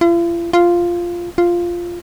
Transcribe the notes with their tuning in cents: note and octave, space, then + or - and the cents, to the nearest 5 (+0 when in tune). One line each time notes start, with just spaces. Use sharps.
F4 -45
F4 -5
F4 -5